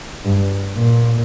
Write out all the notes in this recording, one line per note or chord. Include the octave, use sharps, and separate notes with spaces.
G2
A#2